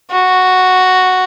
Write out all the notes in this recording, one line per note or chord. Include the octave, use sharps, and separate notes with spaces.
F#4